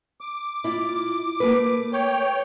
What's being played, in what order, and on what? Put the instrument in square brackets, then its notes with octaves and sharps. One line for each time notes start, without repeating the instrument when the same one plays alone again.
[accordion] D6
[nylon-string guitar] E4 F4
A3 A#3 B4
[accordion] C#5 G5